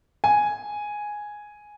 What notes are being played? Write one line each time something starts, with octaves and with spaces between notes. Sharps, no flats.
G#5